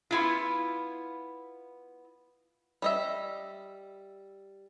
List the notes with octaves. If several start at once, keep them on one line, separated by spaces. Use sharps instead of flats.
B3 E4 F4
G3 D#5 E5